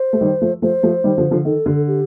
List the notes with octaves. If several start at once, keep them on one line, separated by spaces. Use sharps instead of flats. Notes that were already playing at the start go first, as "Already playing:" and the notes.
Already playing: C5
A3
D#3 G3
F3 A3
F3 A3 C5
F3 A3
D#3 G3
D3 F3
D3 F3
D#3 A4
D3
G4